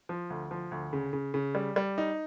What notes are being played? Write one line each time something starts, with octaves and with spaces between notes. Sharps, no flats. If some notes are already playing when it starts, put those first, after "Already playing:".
F3
D2
F3
D2
C#3
C#3
C#3
G3
G3
D#4